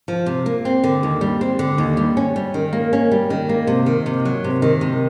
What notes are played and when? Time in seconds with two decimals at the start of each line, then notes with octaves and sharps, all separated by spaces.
0.08 F3
0.26 C3
0.46 A#3
0.65 C4
0.84 D3
1.03 D#2
1.21 G3
1.41 C4
1.59 D3
1.78 D#2
1.97 G3
2.17 C#4
2.36 G3
2.54 D#3
2.73 A#3
2.93 C#4
3.11 G3
3.30 D#3
3.49 A#3
3.67 C3
3.86 D#3
4.06 C3
4.25 F#3
4.44 C3
4.62 D#3
4.81 C3